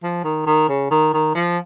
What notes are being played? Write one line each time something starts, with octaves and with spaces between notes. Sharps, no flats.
F3
D#3
D#3
C#3
D#3
D#3
F3